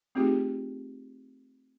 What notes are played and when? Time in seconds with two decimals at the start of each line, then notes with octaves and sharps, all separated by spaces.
0.15 A3 C4 D#4 F4 G4 G#4